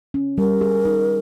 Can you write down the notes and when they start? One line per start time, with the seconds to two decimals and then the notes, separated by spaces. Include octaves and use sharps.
0.14 C#4
0.38 G3 A#4
0.61 G#4
0.85 D#4